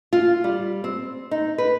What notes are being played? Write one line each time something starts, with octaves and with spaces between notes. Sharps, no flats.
F4
G3
C4
D#4
B4